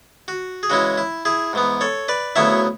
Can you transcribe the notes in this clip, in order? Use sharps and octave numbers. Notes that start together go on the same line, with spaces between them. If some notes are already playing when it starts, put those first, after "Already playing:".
F#4
G#4
C#3 E3 G#3 C#4 E4 F#4
E4
E4 G#4
G#2 E3 B3
A4 C#5
B4 D5
D2 C#3 F#3 B3 E4 C#5 E5